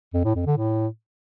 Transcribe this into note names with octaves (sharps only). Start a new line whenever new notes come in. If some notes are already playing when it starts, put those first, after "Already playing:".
F2
A2
F2
D3
A2